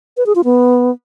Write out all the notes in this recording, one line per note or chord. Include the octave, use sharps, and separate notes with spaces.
B4
G#4
F4
B3